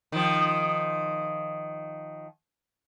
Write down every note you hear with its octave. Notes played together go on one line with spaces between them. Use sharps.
D#3 F3